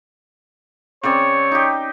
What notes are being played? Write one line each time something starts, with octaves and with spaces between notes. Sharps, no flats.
C#3 C4 C#5 D5
D#4 G4